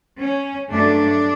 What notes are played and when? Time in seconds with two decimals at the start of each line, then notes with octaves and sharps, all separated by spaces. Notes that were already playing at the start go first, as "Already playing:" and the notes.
0.20 C#4
0.70 G2 F#3 A3 D4